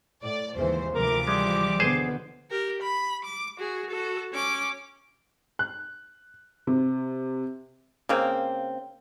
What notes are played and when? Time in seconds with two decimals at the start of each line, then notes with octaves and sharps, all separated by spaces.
0.23 A2 D5
0.55 D#2 G#2 C#3 E3 C5
0.95 D2 C3 E3 F3 A#4 D6
1.27 G3 G#3
1.80 B2 D3 B3 G#4 C5
2.50 G4 A#4
2.82 B5
3.25 D6
3.58 F#4 G#4
3.90 F#4 A4
4.33 C#4 D6
5.59 F#6
6.67 C3
8.09 C#3 A#3 C4